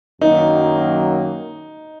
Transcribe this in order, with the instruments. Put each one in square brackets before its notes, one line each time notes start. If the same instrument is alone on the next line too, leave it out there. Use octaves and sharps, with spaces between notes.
[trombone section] F#2 D#3 F#3 A#3 [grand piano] D#4